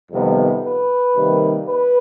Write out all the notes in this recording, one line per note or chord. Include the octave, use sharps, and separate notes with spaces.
F2 C3 D#3 G3 B3
B4
C3 D#3 G3 A#3
B4